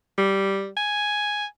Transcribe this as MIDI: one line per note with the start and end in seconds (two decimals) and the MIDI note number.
0.18 0.70 55
0.77 1.45 80